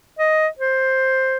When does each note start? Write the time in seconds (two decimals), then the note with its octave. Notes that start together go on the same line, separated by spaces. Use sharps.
0.19 D#5
0.59 C5